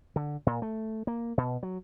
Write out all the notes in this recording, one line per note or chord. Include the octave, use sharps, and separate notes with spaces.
D3
A#2
A3
A#3
B2
F#3